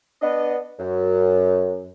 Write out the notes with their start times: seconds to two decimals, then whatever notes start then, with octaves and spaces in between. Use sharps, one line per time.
0.22 B3 D4 D#5
0.80 F#2